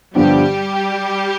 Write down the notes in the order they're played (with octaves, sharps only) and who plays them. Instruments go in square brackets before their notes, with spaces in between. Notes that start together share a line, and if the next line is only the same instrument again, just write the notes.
[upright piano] G2 D3 F3 B3 D4 [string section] G3 G4